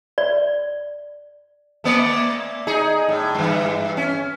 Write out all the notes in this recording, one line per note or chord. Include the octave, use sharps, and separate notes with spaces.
D5
A3 A#3 D5
D#4 G#4
A2
G2 E3
C#4